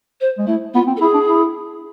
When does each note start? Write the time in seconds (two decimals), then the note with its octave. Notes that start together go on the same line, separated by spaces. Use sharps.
0.21 C5
0.38 G#3
0.47 A3 E4
0.74 B3 F4
0.87 C4
0.97 A4
1.01 E4 G#4
1.14 D4
1.28 E4